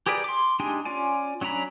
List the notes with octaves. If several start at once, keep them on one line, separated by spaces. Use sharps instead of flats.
G4 G#4 A#4 B4 D5
C6 D6
G#3 D4 D#4 G4 G#5
C#4 F4 D5 G#5
F#3 C#4 D4 A#5 B5